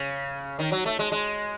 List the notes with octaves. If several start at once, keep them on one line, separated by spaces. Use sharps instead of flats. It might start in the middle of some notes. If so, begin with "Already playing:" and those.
Already playing: C#3
D#3
F#3
A3
G#3
G#3